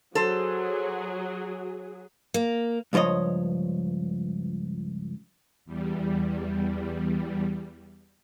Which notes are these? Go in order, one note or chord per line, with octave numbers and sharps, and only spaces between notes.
F#3 G#4 A4 C5
A#3
C#2 G2 F3 C#5 D#5
E2 G3